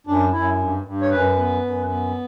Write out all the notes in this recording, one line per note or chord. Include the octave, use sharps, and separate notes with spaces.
F#2 D4
F#2 E4
G2
G2
C#5
F#2 B4
B3
F#2
B3